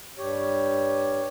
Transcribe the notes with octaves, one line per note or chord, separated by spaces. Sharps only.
G2 G4 C#5